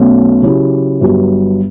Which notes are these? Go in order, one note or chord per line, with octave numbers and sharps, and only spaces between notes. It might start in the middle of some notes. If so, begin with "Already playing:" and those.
Already playing: B1 B2 A3 C#4
C#3 F#3 C#4 E4 G4
G1 G2 F#3